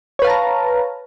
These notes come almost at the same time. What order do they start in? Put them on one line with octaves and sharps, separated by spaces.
C#5 B4 F5 A5 A#5